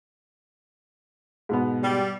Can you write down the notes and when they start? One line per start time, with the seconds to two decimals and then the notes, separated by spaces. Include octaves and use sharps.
1.49 G#2 B2 B3
1.82 G3